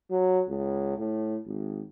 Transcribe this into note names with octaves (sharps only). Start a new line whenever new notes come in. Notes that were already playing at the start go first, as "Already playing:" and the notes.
F#3
C#2
A2
G#1